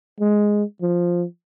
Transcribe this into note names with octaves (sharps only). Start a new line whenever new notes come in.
G#3
F3